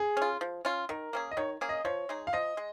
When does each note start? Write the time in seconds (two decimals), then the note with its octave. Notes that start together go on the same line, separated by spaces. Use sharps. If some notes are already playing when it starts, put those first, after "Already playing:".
Already playing: G#4
0.17 C#4 F4
0.41 F3
0.65 C#4 F4
0.89 D#3 A#4
1.13 A#3 C#4 G#4
1.31 D#5
1.37 D#3 C#5
1.61 A#3 C#4 G#4
1.69 D#5
1.85 F3 C#5
2.09 G#3 D#4 G#4
2.27 F5
2.33 F3 D#5
2.57 G#3